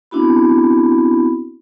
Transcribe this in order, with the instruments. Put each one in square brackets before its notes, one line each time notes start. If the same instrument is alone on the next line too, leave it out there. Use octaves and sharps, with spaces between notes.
[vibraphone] B3 C4 D4 E4 F#4 B5